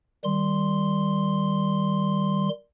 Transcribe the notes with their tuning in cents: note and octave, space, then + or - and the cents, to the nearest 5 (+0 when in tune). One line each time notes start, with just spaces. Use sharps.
D#3 +0 G3 +0 C6 +0